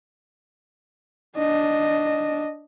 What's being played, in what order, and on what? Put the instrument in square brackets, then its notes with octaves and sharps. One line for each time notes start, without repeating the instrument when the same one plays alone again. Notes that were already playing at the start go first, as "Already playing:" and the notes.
[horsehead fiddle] D4 D#5